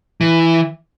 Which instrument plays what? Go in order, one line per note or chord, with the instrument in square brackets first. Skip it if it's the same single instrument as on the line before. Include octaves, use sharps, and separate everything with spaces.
[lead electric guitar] E3